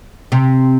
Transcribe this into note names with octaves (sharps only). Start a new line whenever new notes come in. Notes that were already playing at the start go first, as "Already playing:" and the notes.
C3